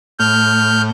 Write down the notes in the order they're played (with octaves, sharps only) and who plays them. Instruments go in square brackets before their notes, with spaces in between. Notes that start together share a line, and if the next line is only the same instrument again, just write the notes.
[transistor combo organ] A2 [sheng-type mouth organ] F6 G6